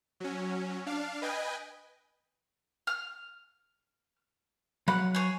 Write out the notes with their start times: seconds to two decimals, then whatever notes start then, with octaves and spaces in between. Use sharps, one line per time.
0.20 F#3 C#4
0.86 D4 F5
1.22 B4 D#5 G5 G#5
2.87 F6
4.88 F#3 F5 F#5 B5
5.15 G#4 C#5